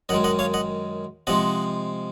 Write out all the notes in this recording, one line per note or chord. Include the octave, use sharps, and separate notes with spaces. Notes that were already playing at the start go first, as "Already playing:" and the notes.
F#2 D#3 G#3 D#5 F#5
D#5 F#5
C#5 F5
D#5 F#5
C3 F3 G#3 D#5 F#5